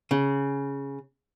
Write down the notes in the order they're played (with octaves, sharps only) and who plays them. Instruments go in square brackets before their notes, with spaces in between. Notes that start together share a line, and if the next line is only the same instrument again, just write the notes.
[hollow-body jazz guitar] C#3